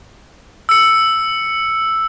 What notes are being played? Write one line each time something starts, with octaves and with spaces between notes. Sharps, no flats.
E6 C#7